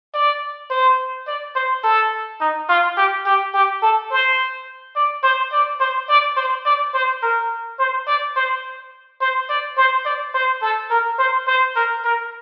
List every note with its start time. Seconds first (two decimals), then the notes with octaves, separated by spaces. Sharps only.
0.14 D5
0.70 C5
1.27 D5
1.55 C5
1.84 A4
2.41 D#4
2.69 F4
2.97 G4
3.26 G4
3.54 G4
3.82 A4
4.10 C5
4.96 D5
5.23 C5
5.52 D5
5.80 C5
6.09 D5
6.37 C5
6.66 D5
6.94 C5
7.23 A#4
7.79 C5
8.07 D5
8.36 C5
9.21 C5
9.49 D5
9.77 C5
10.06 D5
10.34 C5
10.62 A4
10.90 A#4
11.19 C5
11.47 C5
11.76 A#4
12.04 A#4